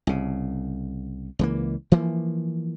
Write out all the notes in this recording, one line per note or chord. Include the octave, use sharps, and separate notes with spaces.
C2 C#3
C#2 E3 A#3
E3 F3 A#3